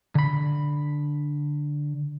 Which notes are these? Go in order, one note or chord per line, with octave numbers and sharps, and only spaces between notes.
D3 B5